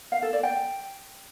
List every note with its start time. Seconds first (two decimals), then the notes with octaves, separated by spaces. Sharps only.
0.12 F5
0.22 A4
0.33 D5
0.43 G5